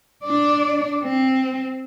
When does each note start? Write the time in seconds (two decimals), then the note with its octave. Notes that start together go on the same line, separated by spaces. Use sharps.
0.24 D4 D5
1.04 C4